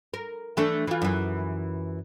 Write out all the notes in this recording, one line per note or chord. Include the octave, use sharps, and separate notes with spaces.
A#4
E3 A3 D4
E3 F4
F#2 E3